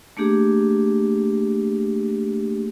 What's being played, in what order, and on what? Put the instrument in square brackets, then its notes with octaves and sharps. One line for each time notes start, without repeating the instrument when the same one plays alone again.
[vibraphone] A3 A#3 D4 G4 G#4